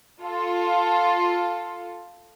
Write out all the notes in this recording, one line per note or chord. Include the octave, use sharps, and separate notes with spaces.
F4 A4